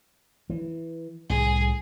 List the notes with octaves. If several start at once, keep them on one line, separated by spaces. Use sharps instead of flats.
E3
C2 A2 G#4